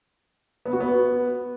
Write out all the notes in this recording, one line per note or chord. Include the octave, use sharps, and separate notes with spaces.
B3
F#4
B3